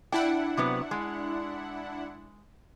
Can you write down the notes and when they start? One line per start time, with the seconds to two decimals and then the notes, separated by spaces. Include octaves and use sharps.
0.12 D4 E4 F#5 G5
0.57 C3 F#3 B3
0.91 G#3